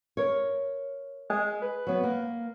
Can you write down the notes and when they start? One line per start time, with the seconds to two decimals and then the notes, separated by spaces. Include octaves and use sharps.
0.17 A#4 C#5
1.30 G#3
1.62 B4
1.87 F#3 B3
2.04 A#3